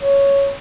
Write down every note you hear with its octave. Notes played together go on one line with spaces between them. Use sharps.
C#5